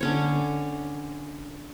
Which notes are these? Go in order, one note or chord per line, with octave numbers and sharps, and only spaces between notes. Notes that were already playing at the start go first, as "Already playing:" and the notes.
D3 C#4 C#5